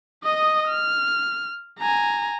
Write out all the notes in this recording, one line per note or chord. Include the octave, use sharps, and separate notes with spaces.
D#5 D#6
F6
G#5 A#5